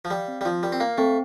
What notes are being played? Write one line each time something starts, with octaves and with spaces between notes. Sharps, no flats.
F3
G3 F5
C4
G3
F3 F4
G3 A#4
C4
A#3 F5
A3 C4